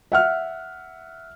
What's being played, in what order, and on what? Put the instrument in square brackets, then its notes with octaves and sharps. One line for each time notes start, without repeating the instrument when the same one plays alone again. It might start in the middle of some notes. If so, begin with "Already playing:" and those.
[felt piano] E5 F#5 F6